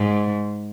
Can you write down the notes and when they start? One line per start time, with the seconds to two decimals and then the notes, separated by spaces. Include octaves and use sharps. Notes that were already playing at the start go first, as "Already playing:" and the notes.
Already playing: G#2